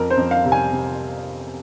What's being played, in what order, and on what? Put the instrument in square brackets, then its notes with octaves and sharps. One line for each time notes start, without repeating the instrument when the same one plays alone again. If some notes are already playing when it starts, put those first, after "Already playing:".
Already playing: [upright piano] F2 A#4
C5
F2
F5
C3
G#5
C3